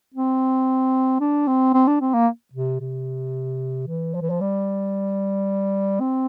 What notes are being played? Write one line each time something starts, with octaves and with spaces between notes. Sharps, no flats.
C4
D4
C4
C4
D4
C4
A#3
C3
C3
E3
F3
E3
F3
G3
C4